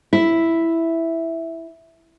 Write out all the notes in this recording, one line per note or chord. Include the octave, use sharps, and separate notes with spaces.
E4 E5